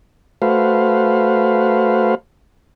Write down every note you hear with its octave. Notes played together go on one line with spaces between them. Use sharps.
A3 F#4 B4 C5 F5